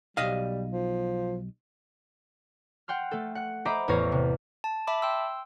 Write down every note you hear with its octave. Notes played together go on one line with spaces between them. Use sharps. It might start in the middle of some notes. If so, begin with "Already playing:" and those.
B1 G3 D#5 F5
F3
F#5 G5 C6 F6
A3 A4
F#5 F#6
C5 D#5 E5 A#5 B5 D6
A1 E2 C#5 F5 A#6
C3
A5
E5 A5 B5 D6
G5 C6 E6